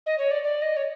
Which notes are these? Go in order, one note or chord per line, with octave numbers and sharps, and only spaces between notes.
D#5
C#5
D5
D5
D#5
C#5